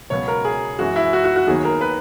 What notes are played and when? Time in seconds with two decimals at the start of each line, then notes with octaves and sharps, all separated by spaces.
0.10 C#2 B2 F#3 B3 C#5
0.28 A#4
0.45 G#4
0.79 F#2 E3 G#3 F#4
0.96 E4
1.13 F#4
1.24 F#4
1.36 F#4
1.47 D#2 D#3 F#3 B3 G#4
1.65 A#4
1.81 B4